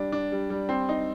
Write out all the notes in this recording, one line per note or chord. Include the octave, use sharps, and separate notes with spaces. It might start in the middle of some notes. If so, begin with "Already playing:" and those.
Already playing: G3 D4
D4
G3
G3
C4
D#4